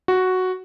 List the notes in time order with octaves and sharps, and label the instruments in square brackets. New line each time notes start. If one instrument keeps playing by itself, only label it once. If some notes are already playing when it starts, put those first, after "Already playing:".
[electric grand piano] F#4